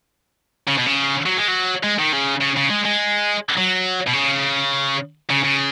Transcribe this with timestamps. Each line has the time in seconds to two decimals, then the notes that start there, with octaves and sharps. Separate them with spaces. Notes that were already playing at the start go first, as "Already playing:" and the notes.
0.68 C#3
0.78 B2
0.87 C#3
1.26 F#3
1.38 G#3
1.48 F#3
1.83 G#3
1.99 D#3
2.12 C#3
2.41 C#3
2.57 C#3
2.70 G#3
2.85 G#3
3.58 F#3
4.08 B2
4.14 C#3
5.30 C#3
5.44 C#3